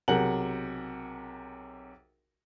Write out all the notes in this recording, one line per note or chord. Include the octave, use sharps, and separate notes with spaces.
B1 C3 G#4 A#4 F#5 F#7